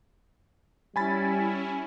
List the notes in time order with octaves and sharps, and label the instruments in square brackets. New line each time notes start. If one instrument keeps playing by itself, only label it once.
[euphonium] G3 [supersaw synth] C#4 E4 [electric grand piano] G#5 B5 A6